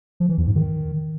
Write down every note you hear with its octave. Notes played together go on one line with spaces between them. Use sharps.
F3
E3
E2
G#2
D#3